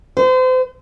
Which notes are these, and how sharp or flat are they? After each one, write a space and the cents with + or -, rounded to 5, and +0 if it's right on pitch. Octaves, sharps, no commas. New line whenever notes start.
C5 -35